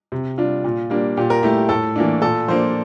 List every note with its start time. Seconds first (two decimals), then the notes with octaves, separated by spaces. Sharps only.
0.12 C3
0.38 G3 D4 F4
0.64 A#2
0.90 G3 A#3 D4
1.17 A#2 G4
1.30 A#4
1.43 A3 E4 G4
1.57 G4
1.69 A2 A4
1.96 E3 A#3 D4
2.22 A#2 A4
2.48 F3 A#3 D4 C5